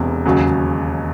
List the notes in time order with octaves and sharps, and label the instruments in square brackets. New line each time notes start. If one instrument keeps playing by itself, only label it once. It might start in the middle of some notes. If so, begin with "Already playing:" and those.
Already playing: [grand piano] E1 E2 C3
E1 D#2 C#3 F#3